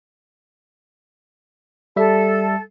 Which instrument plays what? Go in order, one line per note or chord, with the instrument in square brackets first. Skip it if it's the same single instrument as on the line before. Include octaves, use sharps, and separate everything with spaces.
[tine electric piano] G3 E5 [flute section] A4